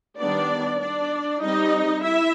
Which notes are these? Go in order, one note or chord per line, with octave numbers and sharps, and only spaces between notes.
D#3 G3 B3 D4 D5
D4 D5
G3 C4 D#4 D#5
E4 E5